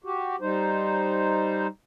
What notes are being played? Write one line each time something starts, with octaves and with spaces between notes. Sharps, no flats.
F#4 G4
G3 D#4 C5